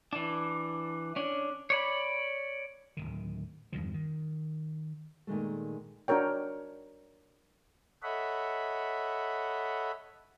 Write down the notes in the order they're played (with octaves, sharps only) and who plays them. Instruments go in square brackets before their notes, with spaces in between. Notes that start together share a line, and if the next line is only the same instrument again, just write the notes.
[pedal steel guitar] E3 D4
C#4 D4
C#5 D5 B5
[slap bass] D1 A#1 D#3
E2 G2 D#3 F3
D#3
[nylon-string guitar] A#2 D#3 G#3 A3
[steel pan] D4 F#4 A#4 C#5 G5
[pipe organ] A4 C#5 D#5 E5 F#5 B5